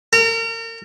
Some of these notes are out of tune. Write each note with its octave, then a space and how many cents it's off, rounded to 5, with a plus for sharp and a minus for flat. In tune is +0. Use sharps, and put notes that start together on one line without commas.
A#4 -35